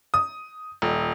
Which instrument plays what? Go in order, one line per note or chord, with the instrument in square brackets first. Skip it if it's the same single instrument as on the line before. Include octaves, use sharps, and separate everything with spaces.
[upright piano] D#6
D#1